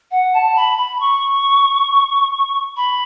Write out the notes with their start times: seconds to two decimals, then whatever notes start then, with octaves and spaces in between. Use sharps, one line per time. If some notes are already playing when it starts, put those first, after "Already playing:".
0.11 F#5
0.34 A5
0.56 B5
0.78 B5
1.00 C#6
2.77 B5